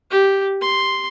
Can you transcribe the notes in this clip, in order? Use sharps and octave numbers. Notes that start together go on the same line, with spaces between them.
G4
C6